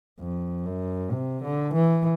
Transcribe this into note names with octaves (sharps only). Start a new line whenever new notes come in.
F2
F#2
C3
D3
E3